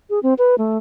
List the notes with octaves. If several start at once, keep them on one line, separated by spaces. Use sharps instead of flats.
G#4
C4
B4
A3